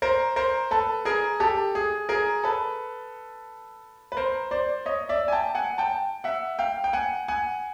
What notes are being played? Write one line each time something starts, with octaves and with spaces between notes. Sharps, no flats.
A#4 C5
A#4 C5
A4 B4
G#4 A#4
G4 A4
G#4
G#4 A#4
A4 B4
B4
A#4 C5
C5 D5
C#5 D#5
D5 E5
G#5
G5 A5
F#5 G#5
G5 A5
E5 F#5
F5 G5
G5
F#5 G#5
F#5 G#5